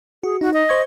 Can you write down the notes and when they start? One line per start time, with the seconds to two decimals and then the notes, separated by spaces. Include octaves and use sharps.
0.23 F#4 G#4
0.41 D#4 F#4
0.53 D#5
0.69 C5 C#6 G#6